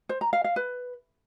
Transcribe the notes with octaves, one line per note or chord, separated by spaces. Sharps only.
C5
A#5
F5
F5
B4